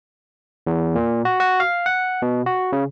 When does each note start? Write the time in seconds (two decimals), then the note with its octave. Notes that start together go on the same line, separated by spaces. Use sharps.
0.67 E2
0.95 A#2
1.25 F#4
1.40 F#4
1.60 F5
1.86 F#5
2.22 B2
2.46 F#4
2.72 C#3